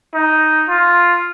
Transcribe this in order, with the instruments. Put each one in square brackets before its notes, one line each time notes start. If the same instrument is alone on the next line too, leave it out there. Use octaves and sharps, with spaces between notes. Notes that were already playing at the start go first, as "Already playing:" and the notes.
[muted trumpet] D#4
F4